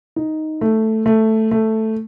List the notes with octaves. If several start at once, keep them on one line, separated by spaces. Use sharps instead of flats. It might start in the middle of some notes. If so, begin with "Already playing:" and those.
D#4
A3
A3
A3